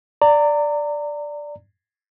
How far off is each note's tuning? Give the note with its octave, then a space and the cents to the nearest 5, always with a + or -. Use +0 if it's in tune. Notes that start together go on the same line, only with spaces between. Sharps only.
D5 +0 A#5 -30